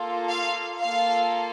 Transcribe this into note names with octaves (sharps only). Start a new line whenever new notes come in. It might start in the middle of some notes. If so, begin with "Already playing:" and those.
Already playing: A#3 F4 A4
F5
A#3 F4 A4 F5